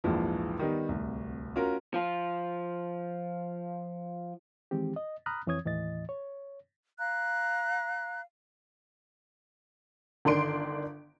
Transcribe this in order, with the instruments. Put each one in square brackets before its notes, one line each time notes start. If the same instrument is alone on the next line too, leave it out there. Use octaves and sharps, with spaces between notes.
[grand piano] A#1 D#2 G#2 E3 F3
D#3 G3 B3 D#4
D1 C2
C#4 F4 F#4 A#4
[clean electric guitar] F3 F4
[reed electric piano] D#3 E3 G#3 C4 G4
D#5
A#5 B5 D#6 F6 F#6
F2 E3 C4 C#5 D#6 G#6
D#2 A2 E3 D#5 A6
C#5
[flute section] F5 A#5 F#6
[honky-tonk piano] G1 D#3 D4 C6 D7